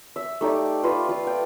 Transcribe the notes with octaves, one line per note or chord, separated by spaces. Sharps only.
E5
A3 D#4 G4 D5
F4 B4 E5
F4 F5
G5